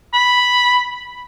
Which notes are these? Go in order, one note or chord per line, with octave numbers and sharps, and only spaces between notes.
B5